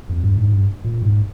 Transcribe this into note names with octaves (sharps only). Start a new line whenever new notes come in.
F2
G2
G#2
G2
A#2
G#2